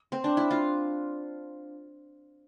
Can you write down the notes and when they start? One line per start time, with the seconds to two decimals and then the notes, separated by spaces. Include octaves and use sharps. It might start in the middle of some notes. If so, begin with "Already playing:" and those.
Already playing: A#3
0.12 C4
0.24 D4
0.37 E4
0.51 F4